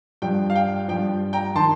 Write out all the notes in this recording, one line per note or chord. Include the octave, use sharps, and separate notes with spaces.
G2 F3 G5
F5
G5
G2 F3 G5
G5 A#5
D#3 A5 C6